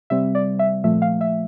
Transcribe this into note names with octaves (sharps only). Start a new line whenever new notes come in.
C3 G3 C4 E5
D5
E5
A#2 F3 A3 E5
F5
E5